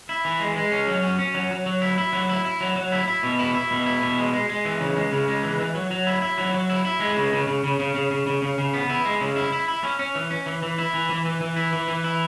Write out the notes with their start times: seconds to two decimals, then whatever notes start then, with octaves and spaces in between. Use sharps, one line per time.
0.09 E4
0.25 E3
0.40 G#3
0.56 G#3
0.72 C#4
0.87 F#3
1.03 C#4
1.19 C#4
1.35 F#3
1.51 F#3
1.66 F#3
1.82 E4
1.98 E4
2.13 F#3
2.29 E4
2.45 E4
2.61 F#3
2.76 F#3
2.92 E4
3.08 E4
3.23 B2
3.39 E4
3.55 E4
3.71 B2
3.86 E4
4.02 B2
4.18 G#3
4.33 G#3
4.49 G#3
4.65 E3
4.80 C#3
4.96 G#3
5.12 C#3
5.28 G#3
5.43 E3
5.59 E3
5.75 F#3
5.91 F#3
6.07 E4
6.22 E4
6.38 F#3
6.54 F#3
6.70 E4
6.85 E4
7.00 G#3
7.17 C#3
7.32 C#3
7.47 C#3
7.64 C#3
7.79 C#3
7.95 C#3
8.11 C#3
8.27 C#3
8.42 C#3
8.58 C#3
8.74 B3
8.89 E4
9.05 G#3
9.21 C#3
9.36 E4
9.52 E4
9.68 E4
9.83 C#4
9.99 C#4
10.15 E3
10.31 C#4
10.46 E3
10.63 E3
10.79 E4
10.94 E3
11.10 E3
11.25 E3
11.41 E3
11.56 E4
11.73 E3
11.88 E3
12.04 E4